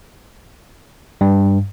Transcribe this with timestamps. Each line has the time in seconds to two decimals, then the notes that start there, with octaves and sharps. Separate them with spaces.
1.21 G2